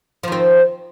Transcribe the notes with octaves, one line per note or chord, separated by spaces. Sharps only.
D#3 F3 C4